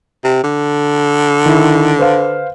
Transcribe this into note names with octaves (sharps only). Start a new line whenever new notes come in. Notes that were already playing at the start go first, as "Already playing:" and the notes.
C3
D3
D#3 E4
B4 C5 F5